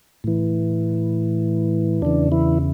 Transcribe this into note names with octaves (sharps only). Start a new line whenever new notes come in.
A2 E3
E2 C#3 E3 D4
E3 E4